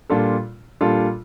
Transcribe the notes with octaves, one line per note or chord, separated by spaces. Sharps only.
A#2 G3 D4 F4 A4
A#2 G3 D4 F4 A4